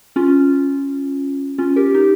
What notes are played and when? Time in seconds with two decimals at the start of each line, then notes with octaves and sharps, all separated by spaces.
0.16 C#4 F4
1.58 C#4 F4
1.76 G4 A#4
1.94 D#4 G4